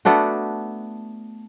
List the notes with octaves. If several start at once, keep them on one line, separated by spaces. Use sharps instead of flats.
A3 B3 D4 F#4